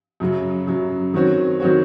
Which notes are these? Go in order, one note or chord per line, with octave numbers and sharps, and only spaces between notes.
F#2 C#3 F#3
F#2 C#3 F#3
D#3 F#3 C4 F#4 C#5
D#3 F#3 C4 F#4 C#5